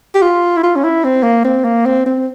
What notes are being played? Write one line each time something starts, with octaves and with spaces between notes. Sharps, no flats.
G4
F4
E4
F4
C#4
E4
C4
A#3
C4
A#3
C4
C4